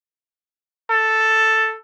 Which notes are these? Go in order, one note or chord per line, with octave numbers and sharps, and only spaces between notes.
A4